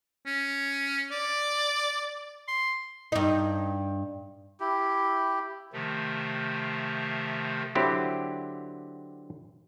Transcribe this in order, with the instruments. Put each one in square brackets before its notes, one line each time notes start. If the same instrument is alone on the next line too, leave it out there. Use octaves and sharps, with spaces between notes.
[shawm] C#4
D5
C6
[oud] G2 D#4
[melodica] E4 G4
[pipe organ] C3 D#3 F3 A3
[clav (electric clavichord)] D3 F#3 C4 E4 G4